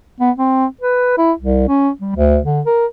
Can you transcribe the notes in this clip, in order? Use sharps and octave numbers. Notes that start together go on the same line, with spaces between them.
B3
C4
B4
E4
C2
C#4
G3
D2
D3
A#4